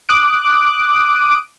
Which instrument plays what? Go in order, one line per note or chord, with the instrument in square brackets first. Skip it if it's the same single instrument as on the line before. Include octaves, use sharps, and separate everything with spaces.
[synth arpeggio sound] D6 D#6 F#6 D7